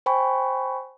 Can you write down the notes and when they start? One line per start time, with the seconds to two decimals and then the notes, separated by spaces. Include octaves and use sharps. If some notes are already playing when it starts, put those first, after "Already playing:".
0.06 C5 G5 G#5 B5 C#6